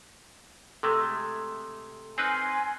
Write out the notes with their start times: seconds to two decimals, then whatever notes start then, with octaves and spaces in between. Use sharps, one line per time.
0.83 C3 G#3 A3 A4
2.18 C4 D#4 B4 G#5 C6 F6 F#6 C7